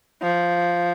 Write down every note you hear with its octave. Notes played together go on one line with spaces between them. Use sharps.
F3